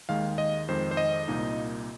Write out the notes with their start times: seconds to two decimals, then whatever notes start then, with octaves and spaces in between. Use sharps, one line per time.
0.09 D#2 D#3 G#3 F5
0.38 D#5
0.68 F2 D#3 G#3 C5
0.91 C5
0.97 D#5
1.28 C2 A#2 A#3 D#4